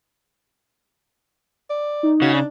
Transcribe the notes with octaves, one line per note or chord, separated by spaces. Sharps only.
D5
D#4
C#3 F#4
D4